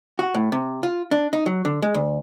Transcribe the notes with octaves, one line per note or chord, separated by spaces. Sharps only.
F#4
A2
C3
F4
D4
D#4
F#3
D3
G#3
D2